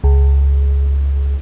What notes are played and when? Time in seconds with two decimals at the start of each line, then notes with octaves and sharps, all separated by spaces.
0.04 C#2